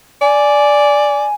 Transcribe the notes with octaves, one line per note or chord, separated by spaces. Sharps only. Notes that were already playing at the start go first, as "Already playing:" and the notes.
D5 G#5